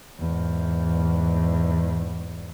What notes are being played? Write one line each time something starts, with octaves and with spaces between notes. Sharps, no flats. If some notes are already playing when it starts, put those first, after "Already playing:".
E2 G#2